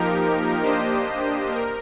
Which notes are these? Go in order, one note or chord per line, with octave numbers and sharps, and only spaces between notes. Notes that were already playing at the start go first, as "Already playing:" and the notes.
Already playing: F3 A#3 D#4 G4 A#4
A#3 D4 G4 C5 D#5
A#4